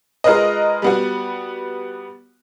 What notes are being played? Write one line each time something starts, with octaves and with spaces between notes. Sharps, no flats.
G#3 F4 A#4 B4 D#5
G3 B3 F#4